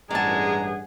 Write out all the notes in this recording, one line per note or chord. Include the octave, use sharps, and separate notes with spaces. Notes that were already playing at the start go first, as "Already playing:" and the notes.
A1 G2 G#3 G#4 D5 F#5 A5 A#5